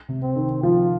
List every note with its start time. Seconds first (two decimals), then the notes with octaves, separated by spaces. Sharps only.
0.09 C3
0.22 C4
0.36 D#3
0.63 F3 F4